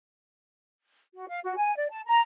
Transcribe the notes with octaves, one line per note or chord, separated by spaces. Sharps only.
F#4
F5
F#4
G#5
D5
A5
A#5